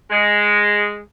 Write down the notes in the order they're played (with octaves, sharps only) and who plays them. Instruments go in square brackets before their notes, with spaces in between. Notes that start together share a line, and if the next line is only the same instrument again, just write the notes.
[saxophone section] G#3